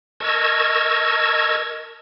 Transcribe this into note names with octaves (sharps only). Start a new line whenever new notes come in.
A#4 D#5 A5 C#6 E6 G#6